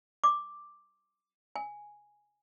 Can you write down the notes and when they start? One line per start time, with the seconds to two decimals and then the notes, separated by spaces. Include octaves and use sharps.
0.24 D6
1.56 G#5